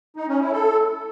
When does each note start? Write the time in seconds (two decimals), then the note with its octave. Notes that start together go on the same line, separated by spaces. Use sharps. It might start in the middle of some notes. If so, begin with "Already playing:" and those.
0.16 D#4
0.28 C#4
0.40 E4
0.52 A4